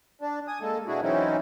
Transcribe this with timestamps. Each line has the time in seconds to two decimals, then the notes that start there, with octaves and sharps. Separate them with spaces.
0.21 D4
0.48 G#5 D#6
0.61 G#3 A#3 A4
0.87 B2 D4 E4 F#4 G#4
1.02 E3 F#3 C4 C#4 D#4 E4